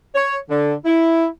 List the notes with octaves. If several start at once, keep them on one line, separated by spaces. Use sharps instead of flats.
C#5
D3
E4